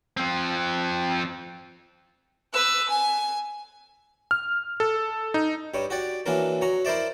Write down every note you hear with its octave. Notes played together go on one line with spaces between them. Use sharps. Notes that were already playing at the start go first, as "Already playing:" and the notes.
F3 C4
B4 E6
G#5
F6
A4
D#4
G2 G3 C#5
F#4 G4 D5
E3 F#3 A#3 D4 A#4
F#3 C#5 A#5
E4 A#4 C5 D5 E5